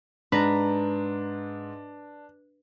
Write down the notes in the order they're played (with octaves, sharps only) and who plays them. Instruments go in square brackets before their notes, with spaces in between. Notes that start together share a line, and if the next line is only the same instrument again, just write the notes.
[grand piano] G#2 [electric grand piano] D4 [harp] B4 A#5